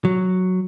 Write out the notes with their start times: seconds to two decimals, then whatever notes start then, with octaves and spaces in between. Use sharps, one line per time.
0.05 F#3